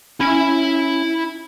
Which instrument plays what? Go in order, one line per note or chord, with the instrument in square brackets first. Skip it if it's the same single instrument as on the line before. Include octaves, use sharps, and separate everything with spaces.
[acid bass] C#4 [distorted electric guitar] E4 B5